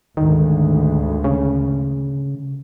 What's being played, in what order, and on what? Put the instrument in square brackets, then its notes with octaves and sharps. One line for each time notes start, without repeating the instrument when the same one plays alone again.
[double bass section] G#1 D2 [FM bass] D#3
[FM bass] C#3